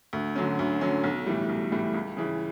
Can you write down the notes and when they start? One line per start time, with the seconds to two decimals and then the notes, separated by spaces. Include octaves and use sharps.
0.13 D2
0.36 D3 F#3 C#4
0.59 D2
0.81 D3 F#3 C#4
1.04 B1
1.26 A2 E3 G3
1.49 B1
1.72 A2 E3 G3
1.94 C#2
2.17 C#3 E3